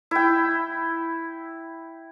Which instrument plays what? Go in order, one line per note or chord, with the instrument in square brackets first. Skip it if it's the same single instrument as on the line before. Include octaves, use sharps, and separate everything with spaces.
[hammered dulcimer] E4 G5